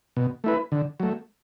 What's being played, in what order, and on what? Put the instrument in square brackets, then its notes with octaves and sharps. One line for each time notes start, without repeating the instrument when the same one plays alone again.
[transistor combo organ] B2
A3 E4 B4
D3
F#3 A3